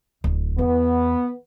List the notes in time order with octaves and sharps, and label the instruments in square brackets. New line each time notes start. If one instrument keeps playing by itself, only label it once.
[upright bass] D1
[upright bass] E2 [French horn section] B3